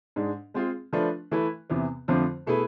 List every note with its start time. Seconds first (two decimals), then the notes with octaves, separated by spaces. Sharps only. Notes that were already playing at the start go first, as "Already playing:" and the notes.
0.16 G#2 G#3 D4
0.54 G#3 C4 F4 G#4
0.93 F3 A3 D4 F4 B4
1.31 E3 A3 E4 B4
1.70 E2 C3 E3 B3
2.08 F2 D3 F3 A3 C4
2.47 B2 A3 E4 G#4 B4